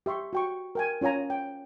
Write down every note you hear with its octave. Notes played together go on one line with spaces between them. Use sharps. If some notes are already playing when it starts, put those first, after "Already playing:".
G4 E5 C6 C#6
F#4 G5 C#6
A#4 G5 G#5
C#4 F4 C#5 G#5 A#5
G5